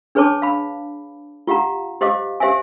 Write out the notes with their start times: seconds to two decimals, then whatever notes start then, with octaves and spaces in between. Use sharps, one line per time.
0.15 D4 G#4 B4 C#5 A5 D6
0.42 F5 B5
1.47 F4 G4 F5 F#5 A#5
2.01 G4 C5 D#5 F5 D6
2.40 G4 C5 E5 F5 G#5